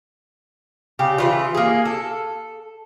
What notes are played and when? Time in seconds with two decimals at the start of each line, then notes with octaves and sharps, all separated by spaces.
0.99 C#3 G4
1.18 C#3 E3 F4
1.54 A#3 G#4
1.85 A4